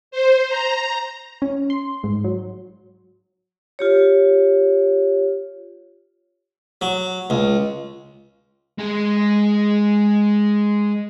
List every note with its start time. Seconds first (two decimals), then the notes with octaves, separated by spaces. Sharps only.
0.11 C5
0.49 A#5
1.42 C#4
1.70 C6
2.04 G#2
2.24 F#3
3.79 F4 G4 C#5
6.81 F#3
7.30 C#2
8.78 G#3 G#4